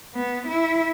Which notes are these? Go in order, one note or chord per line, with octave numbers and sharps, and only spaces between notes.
B3
E4